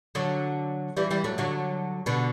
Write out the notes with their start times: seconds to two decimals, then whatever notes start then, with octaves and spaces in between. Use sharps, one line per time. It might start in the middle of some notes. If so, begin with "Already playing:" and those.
0.15 D3 F#3
0.97 E3 G3
1.11 E3 G3
1.24 F#3 A3
1.38 D3 F#3
2.06 B2 D3